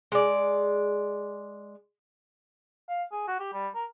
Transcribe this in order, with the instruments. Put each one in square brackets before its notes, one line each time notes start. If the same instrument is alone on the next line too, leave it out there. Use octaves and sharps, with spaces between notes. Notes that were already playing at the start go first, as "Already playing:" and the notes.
[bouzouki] G#3 D5
[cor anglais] F5
G#4
F#4
G4
G3
A#4